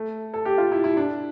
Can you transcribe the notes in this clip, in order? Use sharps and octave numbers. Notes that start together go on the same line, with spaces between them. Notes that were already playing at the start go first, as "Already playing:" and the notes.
Already playing: A3
A4
G4
F4
E4
E4
D4